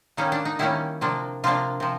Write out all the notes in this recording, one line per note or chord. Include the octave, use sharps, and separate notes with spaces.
D#3 G3 A#3 C#4 D#4
D4
D#4
D#3 G3 A#3 C#4 E4
C3 F3 A#3 D4
C3 F3 A#3 D4 F4
C3 F3